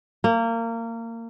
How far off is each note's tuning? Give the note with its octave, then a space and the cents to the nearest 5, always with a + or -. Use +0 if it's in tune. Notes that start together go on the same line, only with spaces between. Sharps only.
A#3 -25